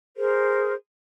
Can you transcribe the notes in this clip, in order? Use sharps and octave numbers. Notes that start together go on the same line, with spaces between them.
G#4 A#4 C5